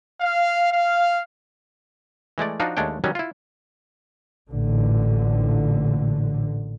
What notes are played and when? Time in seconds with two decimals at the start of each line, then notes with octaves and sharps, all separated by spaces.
0.20 F5
0.71 F5
2.38 E3 G#3 A3 D5
2.60 F3 D4 D#4 F4 F#4
2.77 D#2 G#3 A3 D4 C#5 G5
3.04 D#3 F#3 G3 C#4
3.15 E4 F4
4.51 A1 A#2 D3